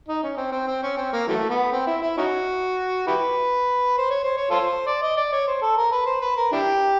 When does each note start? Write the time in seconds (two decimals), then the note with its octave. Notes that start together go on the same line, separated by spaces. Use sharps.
0.08 D#4
0.23 C#4
0.37 C4
0.52 C4
0.67 C4
0.83 C#4
0.97 C4
1.13 A#3
1.28 E3 F#3 A3
1.49 B3
1.72 C4
1.87 E4
2.02 E4
2.17 C#4 D#4 F#4
3.07 E4 G4 B4
3.97 C5
4.10 C#5
4.23 C5
4.37 C#5
4.50 F4 A4 C5
4.87 D5
5.02 D#5
5.17 D5
5.32 C#5
5.47 C5
5.62 A4
5.77 A#4
5.92 B4
6.06 C5
6.21 B4
6.37 A#4
6.52 D4 E4 G4